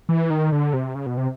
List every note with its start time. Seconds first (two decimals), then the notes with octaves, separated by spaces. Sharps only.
0.09 E3
0.30 D#3
0.52 D3
0.73 C3
0.95 C#3
1.06 B2
1.17 C3